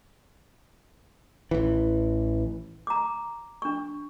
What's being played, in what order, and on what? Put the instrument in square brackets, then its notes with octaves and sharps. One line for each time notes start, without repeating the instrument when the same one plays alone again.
[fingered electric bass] A1 E3
[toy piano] A#5 D6
D4 C#6